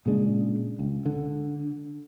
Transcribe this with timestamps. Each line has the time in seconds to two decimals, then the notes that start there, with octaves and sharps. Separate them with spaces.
0.06 A#2 C#3 G#3 D4
0.79 C#2
1.06 D3